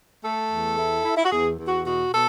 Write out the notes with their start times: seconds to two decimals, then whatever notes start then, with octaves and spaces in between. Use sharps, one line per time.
0.23 A3 A4
0.50 E2
0.77 E4
1.04 E4
1.16 E4
1.24 F#4
1.31 E2 G#4
1.58 E2
1.67 F#4
1.85 B2 F#4
2.12 B2 A4